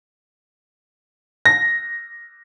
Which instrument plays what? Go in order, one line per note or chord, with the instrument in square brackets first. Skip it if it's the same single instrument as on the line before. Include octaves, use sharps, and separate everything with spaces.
[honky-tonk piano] A#6